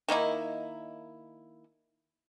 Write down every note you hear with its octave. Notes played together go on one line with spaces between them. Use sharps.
D#3 A#3 D#4 E4